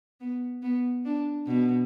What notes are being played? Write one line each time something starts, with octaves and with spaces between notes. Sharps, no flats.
B3
B3
D4
B2